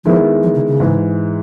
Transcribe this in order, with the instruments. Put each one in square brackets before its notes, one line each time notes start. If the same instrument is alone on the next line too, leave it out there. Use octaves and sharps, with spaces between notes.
[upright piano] D#3 G#3 B3 E4 [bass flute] F3
[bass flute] F3
C#3
C#3
[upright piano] G#2 E3 G#3